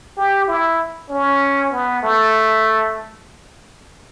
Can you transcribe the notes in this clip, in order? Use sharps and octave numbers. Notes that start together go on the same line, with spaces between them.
G4
E4
C#4
B3
A3